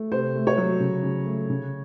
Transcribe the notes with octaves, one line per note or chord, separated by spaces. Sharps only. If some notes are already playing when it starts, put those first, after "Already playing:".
Already playing: A3
C3 C5
A3
C#5
F#3
C#3
C#3
A3
C#3